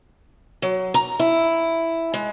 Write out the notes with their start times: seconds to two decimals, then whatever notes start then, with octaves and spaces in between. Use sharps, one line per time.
0.62 F#3
0.94 A#5
1.19 E4
2.14 G#3